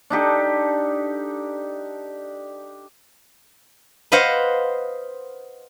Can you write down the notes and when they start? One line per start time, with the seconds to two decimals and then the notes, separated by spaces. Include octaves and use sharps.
0.10 D4 D#4 G4 A4
4.12 B4 C5 D#5 F5 F#5